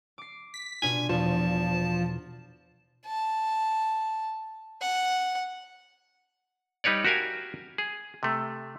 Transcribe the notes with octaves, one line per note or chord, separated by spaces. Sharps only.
D6 C7
B6
B2 D4 F4 G#5
E2 B2 F3 A5
A5
F#5
G3 D#4 B4 C#5 D5
F#4 G4 A#4 F5 G#5
G#4
C3 A3